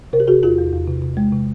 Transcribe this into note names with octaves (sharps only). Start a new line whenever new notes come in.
C3 A#4 C5
G4
C3 F#4 G#4
E2 F4 G4
E2
E2
C3
C3
G#3
C3